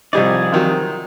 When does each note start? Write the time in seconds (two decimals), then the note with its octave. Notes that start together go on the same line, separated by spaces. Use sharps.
0.13 C2 F3 G3 D#4 G#4 D5
0.52 C3 D#3 F#3